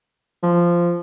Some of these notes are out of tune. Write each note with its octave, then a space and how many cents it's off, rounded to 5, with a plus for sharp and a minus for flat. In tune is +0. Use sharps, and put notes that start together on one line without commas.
F3 -10